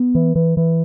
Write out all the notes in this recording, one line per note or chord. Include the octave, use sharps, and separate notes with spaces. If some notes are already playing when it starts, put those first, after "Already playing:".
Already playing: B3
E3
E3
E3